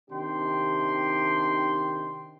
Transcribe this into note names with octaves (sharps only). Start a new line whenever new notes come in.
C3 D#3 D4 G4 G5 C6